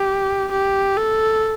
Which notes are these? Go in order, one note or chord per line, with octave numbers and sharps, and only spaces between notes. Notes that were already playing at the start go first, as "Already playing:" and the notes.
Already playing: G4
G4
A4